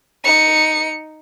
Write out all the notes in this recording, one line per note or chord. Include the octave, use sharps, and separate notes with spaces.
D#4 C#7